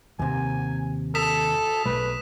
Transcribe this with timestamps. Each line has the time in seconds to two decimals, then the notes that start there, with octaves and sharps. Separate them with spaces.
0.19 D#2 C3 G#5
1.15 A4 D#6 B6 E7
1.85 B1 A3 B4